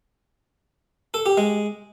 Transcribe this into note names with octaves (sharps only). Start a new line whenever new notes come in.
A4
G4
G#3